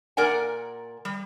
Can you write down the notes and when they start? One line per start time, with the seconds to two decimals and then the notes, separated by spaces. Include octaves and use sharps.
0.17 A#2 A#4 D5 F#5 G#5
1.05 G3